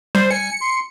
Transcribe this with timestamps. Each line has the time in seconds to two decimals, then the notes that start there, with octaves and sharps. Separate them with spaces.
0.15 G3 C5
0.31 G#5 C#7
0.61 C6